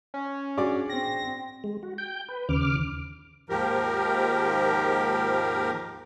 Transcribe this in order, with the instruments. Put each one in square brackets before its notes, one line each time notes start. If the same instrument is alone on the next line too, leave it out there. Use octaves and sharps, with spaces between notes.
[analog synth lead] C#4
[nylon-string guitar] D4 F#4 G#4 [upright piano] D5 D6
[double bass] C4 [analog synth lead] A#6
[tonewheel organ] G#3
F#4
G5 G6
B4
D#2 C#3 D6 F6
[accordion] D#2 G#2 F3 G4 A#4